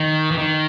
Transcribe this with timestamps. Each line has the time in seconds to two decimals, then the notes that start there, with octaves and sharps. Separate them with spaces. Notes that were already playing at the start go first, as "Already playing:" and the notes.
Already playing: D#3
0.31 E3
0.38 D#3